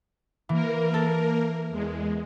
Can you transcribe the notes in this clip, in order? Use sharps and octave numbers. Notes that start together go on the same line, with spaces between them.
E3 A#3 A#4
A4
E2 G#3